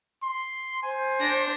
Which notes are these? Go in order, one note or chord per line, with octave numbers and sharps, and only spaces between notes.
C6
C5 G#5
D4 A#6